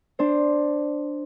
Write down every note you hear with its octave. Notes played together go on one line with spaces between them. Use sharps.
D4 C5